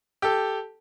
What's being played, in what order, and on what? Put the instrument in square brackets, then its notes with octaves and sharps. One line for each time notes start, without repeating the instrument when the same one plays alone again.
[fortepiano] G4 A4